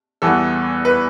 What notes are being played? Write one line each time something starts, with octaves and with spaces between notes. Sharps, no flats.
E2 E3 G3 B3 A4
B4